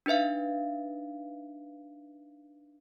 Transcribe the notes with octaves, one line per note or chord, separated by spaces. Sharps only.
D4 D#4 B4 E5 F5